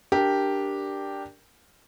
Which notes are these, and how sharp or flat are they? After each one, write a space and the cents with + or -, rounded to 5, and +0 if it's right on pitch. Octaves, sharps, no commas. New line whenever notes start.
D4 +0 G4 +0 A#4 +0